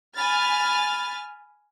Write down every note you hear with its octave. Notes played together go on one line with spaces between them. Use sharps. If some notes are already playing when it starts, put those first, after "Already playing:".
G#5 B5 F6 A6